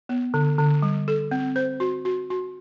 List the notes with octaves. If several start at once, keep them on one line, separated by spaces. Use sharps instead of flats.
B3
D3
D3
G3
A4
C4
C5
F#4
F#4
F#4